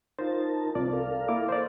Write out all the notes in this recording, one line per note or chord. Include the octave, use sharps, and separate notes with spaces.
D#4 F4 A#4 C5 A5
C2 C4 F4 D5
A4 A#4 F5
A#3 E4 D6
C5 D5